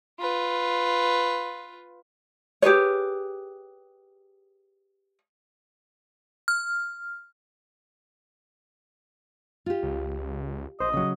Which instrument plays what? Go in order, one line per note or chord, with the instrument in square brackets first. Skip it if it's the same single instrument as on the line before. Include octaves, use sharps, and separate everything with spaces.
[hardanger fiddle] F4 B4
[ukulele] G4 G#4 B4 C#5
[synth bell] F6
[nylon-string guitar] F4 G4
[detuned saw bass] C#2
[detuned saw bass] A#1 [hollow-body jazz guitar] C5 [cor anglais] D#5
[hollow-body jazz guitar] C#3 F#3